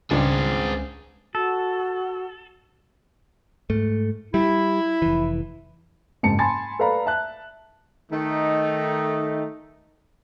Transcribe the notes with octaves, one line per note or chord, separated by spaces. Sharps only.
C#2 G2 C4 D4 G#4
F#4 A4
G#2 A3
G3 E4
F1 E3
F#1 G#2 A5 C#7
G#5 A5 B5 C6 A6
A4 B4 D5 F5 A#5 B5
E5 A5 F#6
D#3 A3 D#4